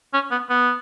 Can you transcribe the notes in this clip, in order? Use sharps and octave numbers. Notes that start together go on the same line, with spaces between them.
C#4
B3
B3